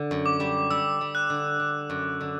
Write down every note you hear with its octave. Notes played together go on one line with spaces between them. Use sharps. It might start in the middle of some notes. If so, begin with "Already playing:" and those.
Already playing: D3
F#2
D6
G3
G3 E6
G3
F#6
D3
D3
F#2
D3